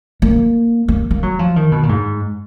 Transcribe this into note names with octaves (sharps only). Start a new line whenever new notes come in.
A#3
A#3
A#3
F#3
F3
D#3
B2
A#2
G#2